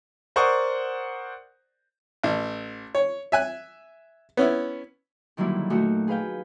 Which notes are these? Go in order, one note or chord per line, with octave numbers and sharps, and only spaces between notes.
A#4 C5 D5 F#5 C#6 D#6
A1
C#5
E5 G#5 F#6
B3 C#4 E4
D3 D#3 F#3 G3 A#3 E4
A#2 A3 D#4 F#4
G#4 B4 F5 G5